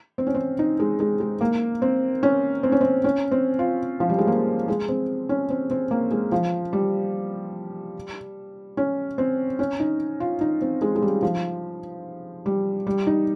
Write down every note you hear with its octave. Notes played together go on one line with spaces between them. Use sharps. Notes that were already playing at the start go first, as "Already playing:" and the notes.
C4
C#4
C4
D#4
G#3
G#3
G#3
A#3
C4
C#4
C4
C#4
C4
C#4
C4
F4
F3
G3
G#3
A#3
G#3
C4
C#4
C4
C4
A#3
G#3
F3
G3
C#4
C4
C#4
D#4
F4
D#4
C4
G#3
G#3
G3
F3
G3
G3
D#4